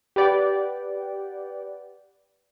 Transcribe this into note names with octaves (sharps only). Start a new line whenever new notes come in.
G4 B4 D5 F#5 G5